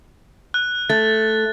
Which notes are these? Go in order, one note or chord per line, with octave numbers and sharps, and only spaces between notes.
F#6
A3 A6